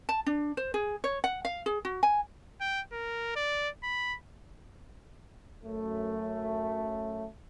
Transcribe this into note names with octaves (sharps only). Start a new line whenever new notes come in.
A5
D4
C5
G#4
C#5
F#5
F5
G#4
F#4
G#5
G5
A#4
D5
B5
F#2 A3